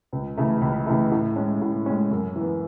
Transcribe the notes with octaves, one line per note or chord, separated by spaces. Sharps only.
C#2
C#3 E3 A3
C#2
C#3 E3 A3
A2
G#3 C#4
A2
G#3 C#4
F#2
E3 B3